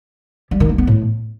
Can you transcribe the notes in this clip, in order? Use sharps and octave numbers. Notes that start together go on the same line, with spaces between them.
G3
D#3
A#3
B3
A2